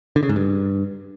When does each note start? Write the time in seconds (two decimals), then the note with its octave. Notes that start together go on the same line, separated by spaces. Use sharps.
0.16 D3
0.23 C#3
0.29 G#2
0.36 G2